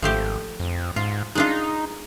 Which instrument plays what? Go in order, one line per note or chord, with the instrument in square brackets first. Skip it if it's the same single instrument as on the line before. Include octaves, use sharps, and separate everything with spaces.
[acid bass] G#1 [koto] F3 A3 G4
[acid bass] F2
[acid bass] G#2 [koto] F4
[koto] G#3 D4 F4 [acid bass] D#4